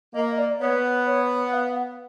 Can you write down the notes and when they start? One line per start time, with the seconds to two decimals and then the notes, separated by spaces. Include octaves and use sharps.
0.14 A#3 D#5
0.31 D#5
0.37 D5
0.60 B3 C#5
1.06 C#5
1.53 F5
1.75 F#5